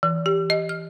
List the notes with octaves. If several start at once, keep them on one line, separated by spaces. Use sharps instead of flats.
E3
G4
D#5
F6